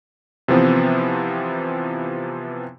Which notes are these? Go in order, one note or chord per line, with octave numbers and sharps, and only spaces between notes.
C3 E3 F3 B3 C4